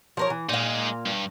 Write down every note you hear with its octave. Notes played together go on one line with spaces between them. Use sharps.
F3 A#4 C#5
E3
A#2 G#3 D#4 F5
G2